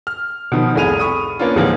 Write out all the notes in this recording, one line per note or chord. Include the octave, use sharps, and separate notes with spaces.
F6
B2 D#3 F3
F1 C2 A2 G#4 D#7 F7
B5 C#6 D#6 D#7
A#3 B3 C#4 D4 F4
C#2 G#2 E3 F3 A#3